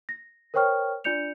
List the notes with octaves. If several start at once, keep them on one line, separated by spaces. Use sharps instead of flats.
A#6
A#4 C5 C#5 G5 C#6 F6
D4 F4 D5 G6 C#7 F7